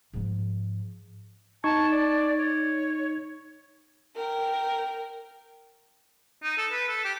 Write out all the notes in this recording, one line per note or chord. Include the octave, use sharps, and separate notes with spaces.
G#2 F3
D#4 A5 C#6 G#6
D5
C#5
A#4 G5
D#4
A4
B4
A4
G4